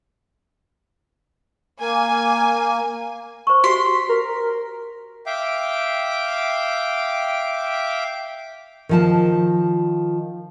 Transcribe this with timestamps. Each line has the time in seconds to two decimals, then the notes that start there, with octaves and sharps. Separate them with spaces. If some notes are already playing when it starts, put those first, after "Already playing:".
1.81 A#3 G#5
3.47 C5 C#6
3.64 F#4 G4 C6 B6
4.09 A#4
5.26 E5 F5 G5 D6
8.89 D#3 F3 A5